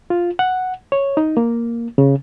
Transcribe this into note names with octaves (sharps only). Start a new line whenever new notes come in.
F4
F#5
C#5
D#4
A#3
C#3